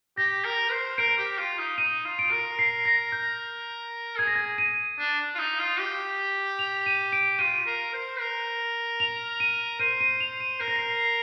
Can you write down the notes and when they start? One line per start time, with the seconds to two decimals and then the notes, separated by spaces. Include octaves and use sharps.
0.17 G4 A#6
0.45 A#4
0.71 C5
0.98 A#4 D7
1.18 G4
1.38 F4
1.58 D#4
1.78 D#4 D#7
2.05 F4
2.19 D7
2.31 A#4
2.59 C7
2.85 A#6
3.12 G6
4.18 G#4 G#6
4.27 A#6
4.35 G#6
4.58 D#7
4.99 D4
5.35 F4
5.39 D#4
5.59 F4
5.80 G4
6.59 F7
6.86 D#7
7.13 D7
7.39 F4 D#7
7.66 A#4
7.93 C5
8.20 A#4
9.00 F7
9.40 D#7
9.79 C5 D#7
10.00 D#7
10.20 F7
10.40 D#7
10.60 A#4 C7
10.68 A#6
10.76 C7